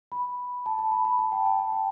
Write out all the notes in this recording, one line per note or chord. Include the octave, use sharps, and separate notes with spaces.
B5
A5
A5
B5
B5
A5
G5
A5
A5
G5